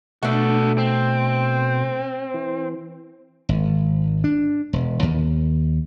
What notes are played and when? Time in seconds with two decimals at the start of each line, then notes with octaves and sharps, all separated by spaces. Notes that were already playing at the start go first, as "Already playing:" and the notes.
0.23 B2 A3 D4 F#4 A4
0.78 C4
2.34 E3
3.49 G#1
4.24 D4
4.73 E1
5.03 D#2